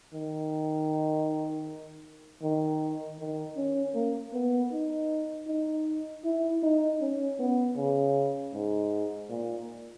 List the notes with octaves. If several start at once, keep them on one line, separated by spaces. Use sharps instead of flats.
D#3
D#3
D#3
C#4
A#3
B3
D#4
D#4
E4
D#4
C#4
B3
C#3
G#2
A#2